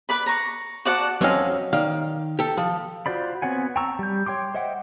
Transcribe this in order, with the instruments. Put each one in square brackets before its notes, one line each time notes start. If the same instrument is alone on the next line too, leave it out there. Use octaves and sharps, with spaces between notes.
[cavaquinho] B4 D5 B5
A#5 C#6
F#4 D5 F#5 A5
[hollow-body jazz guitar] F2 F#3 C4 C#4 D#5 F5
D#3 D5 F5
G4 A4
F3
[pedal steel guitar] F4 F#4 C5 D5 B5
B3 C4 C#5 F#5 G#5
G5 A5 A#5 C#6 E6
G3 G6
C#5 G5 C6 D6
C5 D#5 E5 F#5 G5